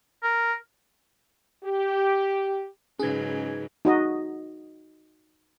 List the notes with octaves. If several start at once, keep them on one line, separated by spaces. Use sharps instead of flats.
A#4
G4
G#2 C#3 F#3 C#4 D#4 G#4 B4 G#6
D#4 F#4 D#5